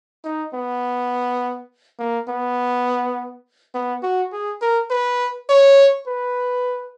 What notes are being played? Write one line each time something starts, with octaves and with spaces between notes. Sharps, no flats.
D#4
B3
A#3
B3
B3
F#4
G#4
A#4
B4
C#5
B4